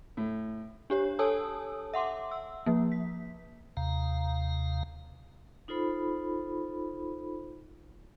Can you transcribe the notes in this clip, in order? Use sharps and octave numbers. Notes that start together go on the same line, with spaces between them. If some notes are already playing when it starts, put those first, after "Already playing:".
A2
D4 G4 C#5
A4 C#5 G#5 A5 D#6 E6
E5 F#5 C6 D6
E6
F3 A#3
B6
D#2 C3 F5 A#5
D#4 F4 A4 C5 B5